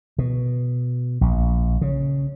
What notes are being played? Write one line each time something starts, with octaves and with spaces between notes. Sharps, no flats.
B2
A#1
C#3